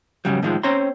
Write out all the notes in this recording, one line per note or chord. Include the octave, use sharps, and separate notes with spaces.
F2 G#2 C#3 F#3 G3
A2 D#3 F3 G#3
C4 C#4 C5 C#5 A#5 C6